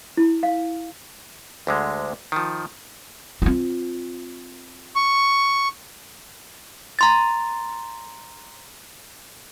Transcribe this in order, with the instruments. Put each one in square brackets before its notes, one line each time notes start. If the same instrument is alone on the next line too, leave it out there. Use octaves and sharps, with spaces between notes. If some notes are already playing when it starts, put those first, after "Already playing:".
[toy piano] E4
F5
[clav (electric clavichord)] D2 D3 G#3
D#3 F3
[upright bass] C4 F4
[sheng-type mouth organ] C#6
[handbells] A#5 C6 A6